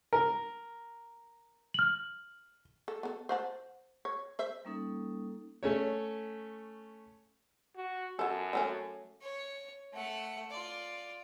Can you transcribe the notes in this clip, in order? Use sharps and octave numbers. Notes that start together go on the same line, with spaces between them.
A#4
F6 F#7
A4
B3 A4
C5 F#5 A5
C#5
C5 E5
G3 A#3 C#4 D#4 A4
A3 C#4 C#5
F#4
F#2 F#4 A4
F#3 A3 C#4
C#5
A3 F#5
F4 D5